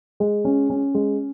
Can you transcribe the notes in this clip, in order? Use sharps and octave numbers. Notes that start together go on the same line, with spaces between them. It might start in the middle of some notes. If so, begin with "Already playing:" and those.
G#3
C#4
C#4
G#3